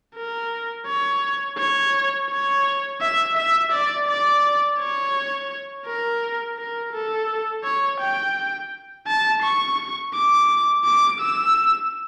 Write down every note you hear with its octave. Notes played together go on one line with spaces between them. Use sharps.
A#4
C#5
C#5
C#5
E5
E5
D5
D5
C#5
A#4
A#4
A4
C#5
G5
A5
C#6
D6
D6
E6